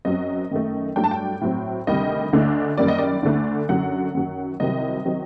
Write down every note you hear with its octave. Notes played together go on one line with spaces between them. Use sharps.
F#2 F#3 C4 D#5
F#2 D#3 A3
G2 F#3 A3 D4 G5
A5
G5
A2 F#3 C4
D2 C3 D#3 G3 D#5
D2 D3 A3 D4
F#2 D#3 G3 A#3 D5
D#5
D5
D2 D3 A3 D4
F#2 D3 F#3 F#5
F#2 D#3 F#3
C2 C3 D#3 F#3 C4 D#5
D#3 F#3 C4